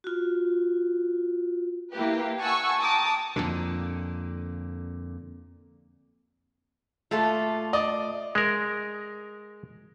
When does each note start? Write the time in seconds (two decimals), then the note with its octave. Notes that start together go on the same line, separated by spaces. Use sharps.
0.04 F4 F#4
1.92 A#3 E4 G4 B4
2.40 F#5 G#5 A5 C#6 E6
2.81 G5 A5 A#5 D6 D#6
3.36 F2 A#2 D3
7.11 A#2 A3 F4 A4
7.73 D5 D#5
8.35 G#3 A#4